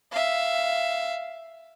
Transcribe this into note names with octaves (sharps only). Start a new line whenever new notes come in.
E5 F5